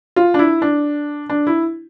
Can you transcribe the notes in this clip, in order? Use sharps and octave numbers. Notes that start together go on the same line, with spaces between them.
F4
D4
E4
D4
D4
E4